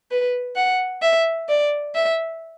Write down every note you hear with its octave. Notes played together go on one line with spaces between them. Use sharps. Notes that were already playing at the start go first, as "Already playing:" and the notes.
B4
F#5
E5
D5
E5